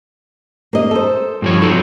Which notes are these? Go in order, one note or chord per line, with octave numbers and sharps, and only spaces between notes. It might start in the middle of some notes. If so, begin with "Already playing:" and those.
A#3 D#5
A4 C5
G2 F3 C#5
F2 F#3 D#4 A4